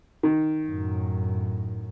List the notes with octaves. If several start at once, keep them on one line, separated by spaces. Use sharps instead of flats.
D#3
F#2 A2